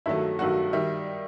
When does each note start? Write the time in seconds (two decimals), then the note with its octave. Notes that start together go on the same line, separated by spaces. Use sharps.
0.06 G2 D#3 F#3 A3 E4 E5
0.39 G2 D#3 F#3 A3 F#4 F#5
0.73 D#3 G3 E5